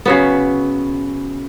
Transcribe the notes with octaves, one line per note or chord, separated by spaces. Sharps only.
C#3 F#3 B3